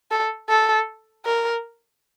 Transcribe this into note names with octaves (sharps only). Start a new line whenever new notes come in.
A4
A4
A#4